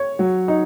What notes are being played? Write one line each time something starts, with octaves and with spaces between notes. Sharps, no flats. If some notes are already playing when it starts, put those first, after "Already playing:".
Already playing: C#5
F#3
D#4